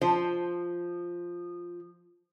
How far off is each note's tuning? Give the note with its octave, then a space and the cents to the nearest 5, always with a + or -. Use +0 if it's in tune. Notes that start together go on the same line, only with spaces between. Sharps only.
F3 +0 C5 +0